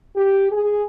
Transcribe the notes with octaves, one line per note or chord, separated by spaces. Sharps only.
G4
G#4